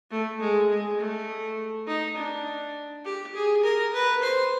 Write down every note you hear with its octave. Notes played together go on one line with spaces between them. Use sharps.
A3
G#3
G#3
A3
D#4
D4
G4
G#4
A#4
B4
C5